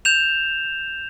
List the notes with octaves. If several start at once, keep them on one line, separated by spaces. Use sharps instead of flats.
G6 E7 F7